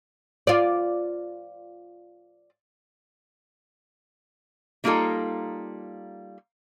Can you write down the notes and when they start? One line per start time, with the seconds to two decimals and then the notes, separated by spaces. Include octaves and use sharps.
0.47 F4 D5
4.84 G3 A#3 D#4 F4 A4